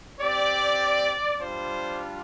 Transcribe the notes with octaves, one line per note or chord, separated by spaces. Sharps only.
C4 G4 D5
G3 D4 F4 C5